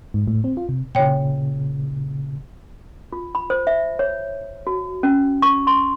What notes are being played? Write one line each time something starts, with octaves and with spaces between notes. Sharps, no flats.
G#2
A2
C4
F4
C3
A#2 C#3 C#5 G5
F4
B5
C5
E5
C#5
F#4
C#4
C#6
C6